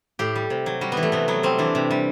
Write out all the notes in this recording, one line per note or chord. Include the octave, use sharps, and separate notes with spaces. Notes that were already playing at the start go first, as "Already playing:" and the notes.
A2 G4
G3
C3
F#3
G3 F#4
B3
E3
A3
C3 B3
F#3 B3
G3 C4
E3 D4
C3
G3